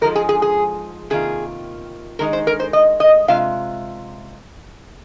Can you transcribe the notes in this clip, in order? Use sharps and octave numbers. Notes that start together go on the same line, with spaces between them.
G#2 F3 G#3 D#4 A#4
G#4
G#4
G#4
C3 D#3 A#3 F4 G#4
D#3 G#3 D#4 A#4
C5
A#4
C5
D#5
D#5
C3 G#3 F4 F5